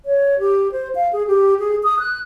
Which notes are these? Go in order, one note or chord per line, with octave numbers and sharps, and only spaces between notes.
C#5
G4
C5
F5
G#4
G4
G#4
D#6
F#6